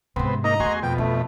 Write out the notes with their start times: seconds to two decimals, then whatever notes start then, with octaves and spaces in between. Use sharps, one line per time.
0.16 G#2 C3 B3 C4
0.44 A#3 D#4 D#5 A#5
0.60 E2 A3 F#4 G#5 C6
0.83 F2 B2 G5
0.98 A3 D#4